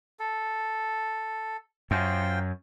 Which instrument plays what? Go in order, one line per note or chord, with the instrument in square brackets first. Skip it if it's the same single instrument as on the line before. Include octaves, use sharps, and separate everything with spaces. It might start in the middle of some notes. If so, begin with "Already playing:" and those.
[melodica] A4
[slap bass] F#2 [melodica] F4 C5 G5